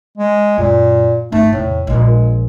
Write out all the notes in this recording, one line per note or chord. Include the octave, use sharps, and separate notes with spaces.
G#3
F#2 A#2
G1 A3 D#4
E2 A2 C3
A#1 A#2 G#3